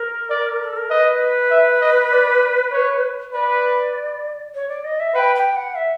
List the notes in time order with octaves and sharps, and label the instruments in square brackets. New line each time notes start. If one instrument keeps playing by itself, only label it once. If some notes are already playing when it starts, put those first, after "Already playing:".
Already playing: [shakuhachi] A#4
[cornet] D5
[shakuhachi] A4
A#4
[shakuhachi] B4 [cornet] D#5
[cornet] E5
D#5
D5
C#5
[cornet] B4 [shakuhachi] D5
[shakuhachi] C#5
D5
D#5
E5
[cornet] B4 [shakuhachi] G5
[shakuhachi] G5
F#5
E5